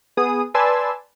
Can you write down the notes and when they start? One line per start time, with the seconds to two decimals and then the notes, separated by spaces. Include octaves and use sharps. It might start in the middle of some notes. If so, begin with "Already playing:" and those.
0.17 B3 G#4 D#6
0.54 B4 D5 G#5 A5 C6 E6